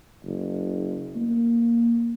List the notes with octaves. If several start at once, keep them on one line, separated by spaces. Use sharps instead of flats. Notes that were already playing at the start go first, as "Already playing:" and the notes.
F#1
A#3